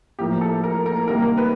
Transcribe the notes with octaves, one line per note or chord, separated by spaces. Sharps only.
A2 F3 A#3 G4
A4
A#4
A#4
C3 D#3 G3 A#3 A#4
B4